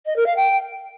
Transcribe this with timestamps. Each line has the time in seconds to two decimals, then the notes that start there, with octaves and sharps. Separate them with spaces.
0.06 D#5
0.16 A#4
0.26 F5
0.36 G5